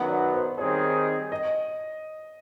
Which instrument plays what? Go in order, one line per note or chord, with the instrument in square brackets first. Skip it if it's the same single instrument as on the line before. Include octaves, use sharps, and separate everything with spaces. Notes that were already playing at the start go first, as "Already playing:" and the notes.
Already playing: [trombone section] F#2 D#3 F#3 B3 D#4 [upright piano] C#5
[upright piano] D5
C5
[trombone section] D#3 G3 C4 D#4 G#4 [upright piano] C#5
[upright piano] D#5